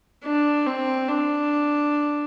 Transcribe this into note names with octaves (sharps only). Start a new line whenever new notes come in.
D4
C4
D4